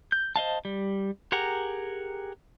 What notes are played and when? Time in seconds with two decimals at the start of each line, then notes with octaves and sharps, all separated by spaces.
0.12 G6
0.36 C5 D#5 F5 A5
0.65 G3
1.32 G4 G#4 A#4 F#5 A#5